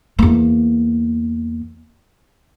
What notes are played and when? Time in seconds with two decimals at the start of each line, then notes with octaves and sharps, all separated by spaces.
0.19 E2 A#3